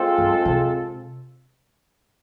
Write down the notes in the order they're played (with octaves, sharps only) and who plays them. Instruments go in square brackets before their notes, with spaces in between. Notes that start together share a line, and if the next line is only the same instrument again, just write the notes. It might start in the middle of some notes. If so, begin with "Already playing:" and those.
Already playing: [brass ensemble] G#3 C4 F4 A4
[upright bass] G2
C3